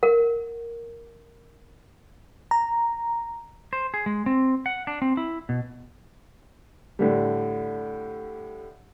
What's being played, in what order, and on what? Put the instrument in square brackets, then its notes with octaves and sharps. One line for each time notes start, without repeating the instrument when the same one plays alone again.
[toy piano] A#4 F#5
[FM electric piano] A#5
[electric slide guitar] C5
G#4
G#3
C4
F#5
D4
C4
E4
B2
[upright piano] A2 D3 G3